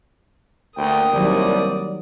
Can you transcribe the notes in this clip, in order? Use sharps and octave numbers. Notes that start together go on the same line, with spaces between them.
D2 A#3 G5 D#6
C2 D#3 F#3 G3 D5